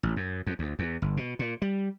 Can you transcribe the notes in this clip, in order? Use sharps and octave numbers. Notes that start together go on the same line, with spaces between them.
A1
F#2
F2
D2
E2
G1
B2
A#2
G3